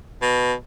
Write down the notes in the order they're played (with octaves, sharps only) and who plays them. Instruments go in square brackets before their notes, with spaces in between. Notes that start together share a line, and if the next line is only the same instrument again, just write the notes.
[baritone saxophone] B2